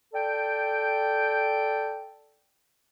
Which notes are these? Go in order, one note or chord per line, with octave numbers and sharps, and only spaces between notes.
A4 D5 G5